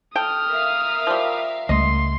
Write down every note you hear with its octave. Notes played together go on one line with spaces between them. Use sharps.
A4 G5 D#6 F6
A#4 E5 F5
F3 G3
C#2 G3 A3 D#5 C6